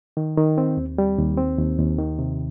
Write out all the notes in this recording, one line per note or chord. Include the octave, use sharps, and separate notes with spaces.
D#3
D#3
C4
D#2
G3
D#2
C4
D#2
D#2
D#3
C3